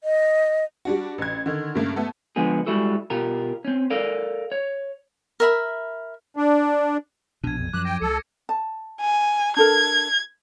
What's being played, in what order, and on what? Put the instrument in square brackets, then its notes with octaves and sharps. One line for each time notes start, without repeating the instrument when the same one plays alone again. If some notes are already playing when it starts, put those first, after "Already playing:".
[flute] D#5
[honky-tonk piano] G3 D4 F#4
A1 G#6
D3 D#3
G2 C#3 A3 A#3
A3 B3 A4
[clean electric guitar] D2 D3 F3 G#3 B3 G#4
G3 G#3 E4 F#4 A4
B2 F4 G4 A#4
C4 C#4
A4 A#4 D5 F5
C#5
[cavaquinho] A#4 E5 B5
[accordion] D4
[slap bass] A#1 B2 [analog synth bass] D4 [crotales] G#6 D#7
[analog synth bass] F2
[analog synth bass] F#2 [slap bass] F3 F#3 [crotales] D6 [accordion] F#6
[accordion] G5 [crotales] A#6
[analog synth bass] C#2 [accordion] A4 [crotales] C#7
[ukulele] A5
[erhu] G#5
[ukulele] D4 A4 A#4 [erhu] G#6